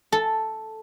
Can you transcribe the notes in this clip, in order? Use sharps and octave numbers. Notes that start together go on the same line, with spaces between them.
A4